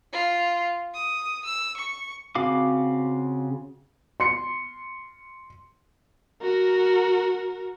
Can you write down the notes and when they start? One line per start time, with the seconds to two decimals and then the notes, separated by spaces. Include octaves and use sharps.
0.13 F4
0.94 D#6
1.45 E6
1.77 C#6
2.35 C#3 C4 F#4 F5 D6
4.20 C6 C#7
6.42 F#4 A#4